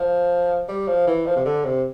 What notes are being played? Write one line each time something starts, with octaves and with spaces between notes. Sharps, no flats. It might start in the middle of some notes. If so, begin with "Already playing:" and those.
Already playing: F3
G3
F3
E3
F3
C3
D3
C3